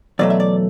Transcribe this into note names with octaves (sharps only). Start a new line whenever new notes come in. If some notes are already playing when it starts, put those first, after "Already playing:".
E2 B2 F#3 A3 D5
E5
D5